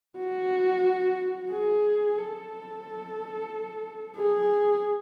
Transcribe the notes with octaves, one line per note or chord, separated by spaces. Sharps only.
F#4
G#4
A4
G#4